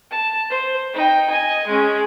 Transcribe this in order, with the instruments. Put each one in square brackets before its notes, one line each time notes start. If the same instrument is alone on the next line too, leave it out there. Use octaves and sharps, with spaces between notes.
[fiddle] A5
C5
D#4 G5
D#5 G#5
G#3 C#4